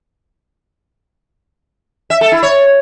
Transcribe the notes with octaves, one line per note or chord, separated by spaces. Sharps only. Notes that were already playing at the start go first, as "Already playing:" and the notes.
E5
A4
E4
C#5